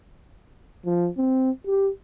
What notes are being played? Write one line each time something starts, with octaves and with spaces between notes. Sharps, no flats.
F3
C4
G4